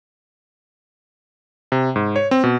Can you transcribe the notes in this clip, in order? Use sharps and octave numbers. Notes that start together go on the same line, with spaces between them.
C3
G#2
C#5
C4
B2